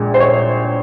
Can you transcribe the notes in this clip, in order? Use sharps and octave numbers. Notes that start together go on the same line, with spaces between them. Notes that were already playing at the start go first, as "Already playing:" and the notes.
Already playing: A#1 A#2 G#3
C5
C#5